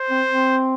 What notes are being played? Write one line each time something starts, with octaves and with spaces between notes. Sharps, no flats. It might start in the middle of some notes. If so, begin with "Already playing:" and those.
Already playing: C5
C4
C4